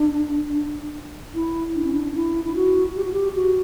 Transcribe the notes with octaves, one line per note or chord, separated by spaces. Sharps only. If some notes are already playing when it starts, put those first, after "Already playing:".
Already playing: D4
E4
D4
C#4
D4
E4
E4
F#4
G4
F#4
G4
F#4